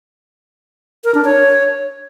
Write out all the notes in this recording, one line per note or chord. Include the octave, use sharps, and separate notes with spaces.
A#4
D4
C#5